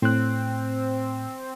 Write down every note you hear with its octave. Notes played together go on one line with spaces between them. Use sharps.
A2 C4 F#6